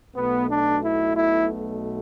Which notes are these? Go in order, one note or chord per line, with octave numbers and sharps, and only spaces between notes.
B1 B2 A3 B3
D4
E4
E4